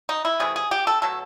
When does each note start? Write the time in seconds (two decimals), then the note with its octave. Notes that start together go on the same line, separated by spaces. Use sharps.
0.09 D#4
0.25 E4
0.40 C3 E3 A3 G#4
0.56 G#4
0.71 G4
0.87 A4
1.02 B2 F#3 A3 A4